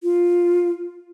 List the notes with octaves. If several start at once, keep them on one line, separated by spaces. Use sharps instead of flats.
F4